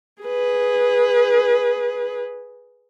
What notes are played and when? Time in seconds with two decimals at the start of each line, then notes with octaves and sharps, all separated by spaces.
0.22 G#4 B4